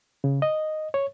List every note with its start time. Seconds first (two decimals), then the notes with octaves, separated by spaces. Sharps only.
0.24 C#3
0.42 D#5
0.94 C#5